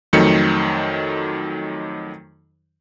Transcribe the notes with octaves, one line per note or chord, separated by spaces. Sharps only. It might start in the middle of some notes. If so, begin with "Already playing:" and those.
F2 D#3 F#3 A3 C#7